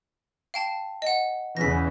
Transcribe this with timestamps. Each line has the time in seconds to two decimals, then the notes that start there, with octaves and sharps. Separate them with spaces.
0.54 F5 G5 A5
1.02 D#5 F#5
1.57 E2 C#3 E3 A#6 B6